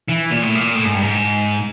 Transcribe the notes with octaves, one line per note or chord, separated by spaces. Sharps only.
E3
A#2
A2
A#2
A2
G#2
G2
G#2